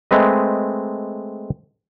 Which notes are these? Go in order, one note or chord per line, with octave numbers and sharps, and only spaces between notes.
G#3 A3 C4 B4 D#5